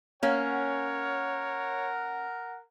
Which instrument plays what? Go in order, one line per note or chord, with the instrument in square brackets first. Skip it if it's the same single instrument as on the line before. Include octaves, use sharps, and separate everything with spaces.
[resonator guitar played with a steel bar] A#3 C#4 [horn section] A#4 F#5 [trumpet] C#5